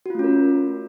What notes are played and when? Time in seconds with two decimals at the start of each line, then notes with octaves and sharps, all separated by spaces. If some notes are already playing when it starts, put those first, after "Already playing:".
0.06 F#4
0.10 F4
0.15 A3
0.19 C#4
0.24 A#4